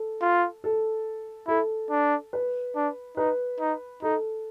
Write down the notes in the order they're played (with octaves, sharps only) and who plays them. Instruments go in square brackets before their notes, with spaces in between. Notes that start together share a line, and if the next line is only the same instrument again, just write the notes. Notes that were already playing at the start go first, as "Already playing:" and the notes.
Already playing: [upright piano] A4
[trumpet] F4
[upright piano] A4
[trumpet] E4 [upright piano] A4
[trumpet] D4
[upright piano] B4
[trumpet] D4
[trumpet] D#4 [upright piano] B4
[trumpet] D#4
[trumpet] D#4 [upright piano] A4